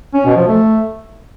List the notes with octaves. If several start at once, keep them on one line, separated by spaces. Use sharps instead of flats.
C#4
B2
F3
A3